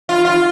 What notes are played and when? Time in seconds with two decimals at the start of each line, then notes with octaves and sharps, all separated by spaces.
0.09 F4
0.25 F4